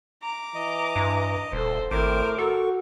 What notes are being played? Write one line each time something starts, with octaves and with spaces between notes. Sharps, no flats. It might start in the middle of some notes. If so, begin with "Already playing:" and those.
A#5 D6
E3 D#5
G2
D#1 A4 C5
G#1 A2 A#4 C5 D6
F#4 A4 C#6